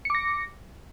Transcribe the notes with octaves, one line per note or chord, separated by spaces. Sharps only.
D6 A#6 C#7